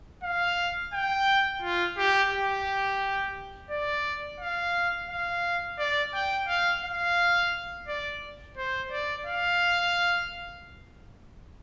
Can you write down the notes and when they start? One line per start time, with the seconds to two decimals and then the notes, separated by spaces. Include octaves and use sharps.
0.23 F5
0.93 G5
1.62 F4
1.98 G4
2.32 G4
3.70 D5
4.40 F5
5.10 F5
5.79 D5
6.14 G5
6.48 F5
6.83 F5
7.88 D5
8.57 C5
8.92 D5
9.27 F5